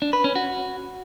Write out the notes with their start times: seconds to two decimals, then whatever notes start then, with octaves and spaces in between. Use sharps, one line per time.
0.02 D4
0.13 B4
0.24 C#4
0.36 F#4